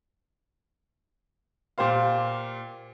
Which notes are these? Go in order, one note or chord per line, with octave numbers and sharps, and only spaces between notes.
A#2 G4 C5 F5